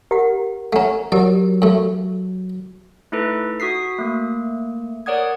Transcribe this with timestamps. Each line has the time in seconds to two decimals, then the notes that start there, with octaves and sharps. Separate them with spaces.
0.11 G4 A#4 F#5
0.73 A3 C#4 F#5 A#5
1.12 F#3 G4 A#4 D5
1.62 F#2 A3
3.12 A3 D#4 E4 A4 B4
3.60 F#4 D#6 B6 C7
3.98 A3 A#3
5.06 A#4 C#5 D5 F#5 D#6 G#6